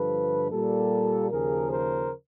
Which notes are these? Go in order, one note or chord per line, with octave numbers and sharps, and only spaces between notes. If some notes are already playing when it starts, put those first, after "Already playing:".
Already playing: G2 D3 F3 A4 B4
A#2 G3 A#3 G4 A4
D#2 C#3 F3 G#4 A#4
A#4 C5